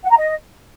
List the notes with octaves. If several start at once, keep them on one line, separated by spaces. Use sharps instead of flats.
F#5
A#5
D#5